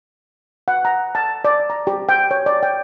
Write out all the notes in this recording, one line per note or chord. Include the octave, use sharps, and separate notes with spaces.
F#5
A#5
A5
D5
A#5
G4
G5
C#5
D5
G5